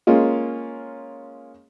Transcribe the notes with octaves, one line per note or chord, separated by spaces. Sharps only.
G#3 A#3 C#4 F4